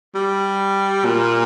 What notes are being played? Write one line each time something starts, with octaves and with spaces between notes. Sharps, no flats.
G3
A#2